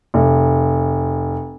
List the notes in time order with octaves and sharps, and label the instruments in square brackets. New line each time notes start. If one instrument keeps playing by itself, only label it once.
[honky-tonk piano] F1